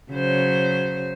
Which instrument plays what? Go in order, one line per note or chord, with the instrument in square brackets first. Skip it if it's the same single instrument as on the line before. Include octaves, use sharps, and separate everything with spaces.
[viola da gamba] C#3 F#3 C5